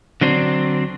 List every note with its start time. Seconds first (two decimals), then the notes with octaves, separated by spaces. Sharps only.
0.21 D3 F#3 C4 D4